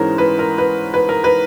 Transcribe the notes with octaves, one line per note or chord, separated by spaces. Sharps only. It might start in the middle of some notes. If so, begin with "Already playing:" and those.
Already playing: G#2 E3 G#3 C#4 A#4 C5
B4
A#4
B4
B4
A#4
B4